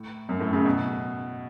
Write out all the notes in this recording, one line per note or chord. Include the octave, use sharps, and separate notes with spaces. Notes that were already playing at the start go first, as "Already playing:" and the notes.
Already playing: A2
F#2
A2
C#3
B2